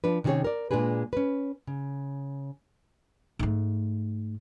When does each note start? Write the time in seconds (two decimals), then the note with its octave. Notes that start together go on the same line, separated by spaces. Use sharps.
0.04 F3 D4 B4
0.24 C3 D#3 C#4 F#4 G#4 C#5
0.44 A#4 D5
0.71 A#2 G#3 D4 G#4 B4
1.13 C#4 B4
1.67 C#3
3.39 G#2 A3